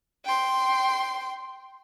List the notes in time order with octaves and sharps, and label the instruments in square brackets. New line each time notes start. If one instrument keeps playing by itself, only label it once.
[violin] G5 C6